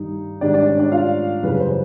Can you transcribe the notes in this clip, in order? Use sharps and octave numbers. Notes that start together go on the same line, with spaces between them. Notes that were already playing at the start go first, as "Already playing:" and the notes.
Already playing: G2 D#3 G3 D#4
G#2 D#3 G3 D4 D5
D4 D5
C#4 C#5
D4 D5
F4 F5
F#2 C#3 E3 G3 B4
C5